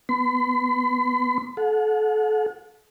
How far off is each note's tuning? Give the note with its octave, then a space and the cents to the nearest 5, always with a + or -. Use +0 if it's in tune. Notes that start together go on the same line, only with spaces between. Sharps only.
B3 +0 B5 +45
A4 -35 F#5 -35